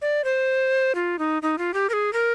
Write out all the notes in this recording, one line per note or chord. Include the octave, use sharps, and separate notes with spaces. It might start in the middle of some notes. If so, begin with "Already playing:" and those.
D5
C5
F4
D#4
D#4
F4
G4
A#4
G#4
A#4